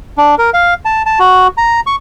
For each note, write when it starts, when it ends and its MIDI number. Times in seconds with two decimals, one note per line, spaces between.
0.18 0.35 62
0.38 0.50 70
0.54 0.74 77
0.85 1.02 81
1.06 1.19 81
1.19 1.47 66
1.58 1.80 82
1.87 1.96 85